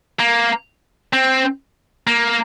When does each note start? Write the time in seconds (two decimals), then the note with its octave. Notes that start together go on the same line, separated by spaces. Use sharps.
0.19 A#3
1.13 C4
2.07 A#3